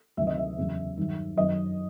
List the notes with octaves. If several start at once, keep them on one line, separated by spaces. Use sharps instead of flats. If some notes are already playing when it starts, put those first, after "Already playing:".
D2 C3 D#3 F#3 E5
D#5
E5
E2 C#3 F#3
G2 D#3 F#3
F#2 D#3 F#3 D#5